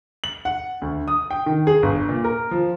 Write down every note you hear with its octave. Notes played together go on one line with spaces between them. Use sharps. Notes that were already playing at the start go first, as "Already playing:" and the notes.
F#7
F#5
D2
D#6
G5
D#3
G#4
G1
A#2
A#4
F3